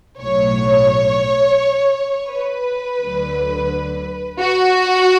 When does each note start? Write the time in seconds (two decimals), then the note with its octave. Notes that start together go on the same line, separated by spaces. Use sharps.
0.21 B1 A2 F#3 C#5
2.29 B4
2.99 D2 D3 F#3
4.39 F#4